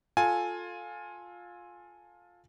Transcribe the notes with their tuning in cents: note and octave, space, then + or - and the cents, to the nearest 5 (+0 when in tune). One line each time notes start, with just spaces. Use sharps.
F4 +15 A4 +0 G#5 +0